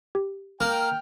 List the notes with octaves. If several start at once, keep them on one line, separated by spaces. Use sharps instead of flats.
G4
A#3 G5 F6